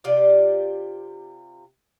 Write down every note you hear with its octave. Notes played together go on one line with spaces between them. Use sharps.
C3 F4 G4 D5